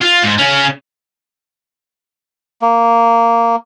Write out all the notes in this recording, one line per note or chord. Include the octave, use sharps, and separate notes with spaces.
F4
G#2
C#3 C#4
A#3